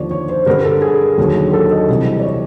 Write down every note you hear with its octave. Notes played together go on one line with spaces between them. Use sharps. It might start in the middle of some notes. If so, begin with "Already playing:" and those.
Already playing: D#2 D3 F3 C#5 D5
C#5
C5
G2 D3 G3 A#4
A4
G#4
D#2 D3 F#3
A4
D#5
C2 C3 E3 G3 D#5
D5
C#5